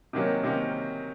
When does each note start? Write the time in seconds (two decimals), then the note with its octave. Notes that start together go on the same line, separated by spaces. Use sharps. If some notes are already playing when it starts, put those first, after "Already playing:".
0.13 C3 D#3 F#3 A#3 C#4
0.43 C3 D#3 F#3 A#3 C#4